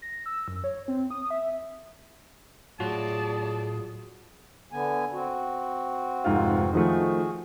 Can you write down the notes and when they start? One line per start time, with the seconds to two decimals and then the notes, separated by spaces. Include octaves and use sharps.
0.02 A#6
0.26 E6
0.48 F#2
0.64 C#5
0.88 C4
1.11 D#6
1.30 E5
2.80 A2 F#3 F4 F#4 G#4 D5 A5
4.72 D3 B3 G#5
5.13 C4 F#4
6.24 F1 G#2 F4
6.73 D#3 F3 A3 F#4 G#4